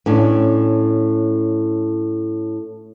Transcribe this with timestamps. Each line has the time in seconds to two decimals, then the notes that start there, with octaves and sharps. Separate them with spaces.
0.06 A2 C#4 D4